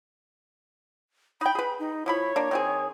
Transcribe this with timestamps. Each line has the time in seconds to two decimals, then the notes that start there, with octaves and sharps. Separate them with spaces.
1.41 D#4 G5 B5
1.55 G#4 B4
1.79 D#4
2.06 F3 E4 C#5 B5
2.36 A#3 D4
2.51 D#3 C4 G#4